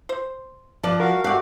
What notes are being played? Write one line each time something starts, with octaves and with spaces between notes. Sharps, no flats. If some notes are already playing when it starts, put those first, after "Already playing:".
C5
F3 B4 D5 A5
F#4 A#4 F5
A3 F#4 G4 D5 F5